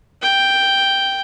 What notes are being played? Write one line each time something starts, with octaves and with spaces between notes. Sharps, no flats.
G5